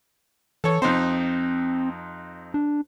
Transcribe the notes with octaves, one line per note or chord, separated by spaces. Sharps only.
E3 A4 C#5
F2 C4 D#4 C5
D4